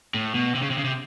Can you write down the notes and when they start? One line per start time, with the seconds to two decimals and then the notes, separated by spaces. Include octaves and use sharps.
0.14 A2
0.35 B2
0.55 C3
0.62 C#3
0.70 C3
0.78 C#3
0.84 C3